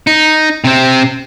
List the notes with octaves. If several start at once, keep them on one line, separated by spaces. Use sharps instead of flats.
D#4
C3 C4